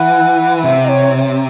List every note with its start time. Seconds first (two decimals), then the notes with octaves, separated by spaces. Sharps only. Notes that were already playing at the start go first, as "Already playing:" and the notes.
Already playing: E3 F#5
0.63 C3 E5
0.84 D#5
0.89 C#5